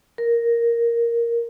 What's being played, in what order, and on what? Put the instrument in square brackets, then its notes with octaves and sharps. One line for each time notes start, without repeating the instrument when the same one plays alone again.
[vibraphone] A#4